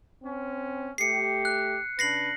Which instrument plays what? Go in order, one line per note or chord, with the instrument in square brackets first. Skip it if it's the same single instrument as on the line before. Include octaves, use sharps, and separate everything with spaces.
[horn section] C4 C#4
[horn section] A3 G4 [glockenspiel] C7 C#7
[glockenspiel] F#6
[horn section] C#3 D4 B4 [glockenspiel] A#6 C7 F#7